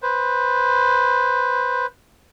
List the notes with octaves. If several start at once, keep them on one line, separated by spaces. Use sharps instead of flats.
B4 C5